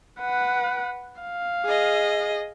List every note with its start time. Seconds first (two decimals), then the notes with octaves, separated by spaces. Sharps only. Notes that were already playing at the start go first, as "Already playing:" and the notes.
0.20 B4 F#5
1.22 F5
1.65 G#4 D#5